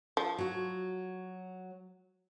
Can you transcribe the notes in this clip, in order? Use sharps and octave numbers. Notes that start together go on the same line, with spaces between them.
F3
F#3 F#4